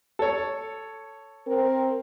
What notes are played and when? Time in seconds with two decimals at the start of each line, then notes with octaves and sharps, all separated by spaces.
0.19 A4 C#5
1.47 C4 A#4